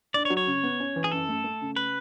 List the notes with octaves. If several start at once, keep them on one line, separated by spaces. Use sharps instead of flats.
D4 D5
C#5
F#3
C#5
C#3
B3
C#4
E3
G#4
F#2 A4
A3
A3
C#3
B4